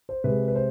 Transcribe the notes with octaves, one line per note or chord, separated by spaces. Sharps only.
C5
C3 G#3 B4
B4
C5